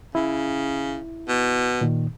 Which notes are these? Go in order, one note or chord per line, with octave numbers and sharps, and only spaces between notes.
C#3 E4
B2
A#2 D#3